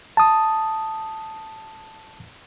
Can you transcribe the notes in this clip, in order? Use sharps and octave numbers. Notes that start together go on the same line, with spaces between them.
A5 D#6